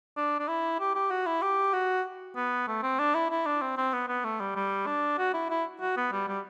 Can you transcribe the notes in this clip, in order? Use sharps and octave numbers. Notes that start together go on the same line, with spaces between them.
D4
D4
E4
G4
G4
F#4
E4
G4
F#4
B3
A3
C4
D4
E4
E4
D4
C4
C4
B3
B3
A3
G3
G3
D4
F#4
E4
E4
F#4
B3
G3
G3